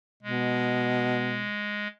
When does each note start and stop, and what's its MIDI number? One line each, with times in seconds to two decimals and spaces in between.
0.23 1.50 47
0.23 1.88 56